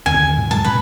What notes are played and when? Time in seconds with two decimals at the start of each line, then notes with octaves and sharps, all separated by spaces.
0.06 D1 E2 D3 G#5
0.17 D#2 D3 D#3
0.37 G#2 B2
0.51 G2 F#3 G#3 A5
0.65 A#2 C#3 B4